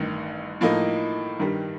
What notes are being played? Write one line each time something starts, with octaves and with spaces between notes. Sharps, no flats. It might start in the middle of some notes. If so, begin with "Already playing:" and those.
Already playing: A1 G2 D#3
A2 F3 A#3 D#4
G2 D#3 G3